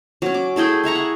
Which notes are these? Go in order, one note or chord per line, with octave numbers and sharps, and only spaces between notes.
F#3 C#4
D6
A3 E4 G#4 G5
G#4 E5 A#5 C#6
F#5